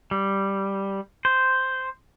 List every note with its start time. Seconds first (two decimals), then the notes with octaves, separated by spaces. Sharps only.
0.11 G3
1.25 C5